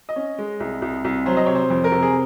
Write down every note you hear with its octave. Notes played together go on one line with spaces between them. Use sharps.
D#5
C#4
G#3
C2
C2
C2
F#3 C5
D#5
C3 C#5
C5
F2
A#4
C3
G#4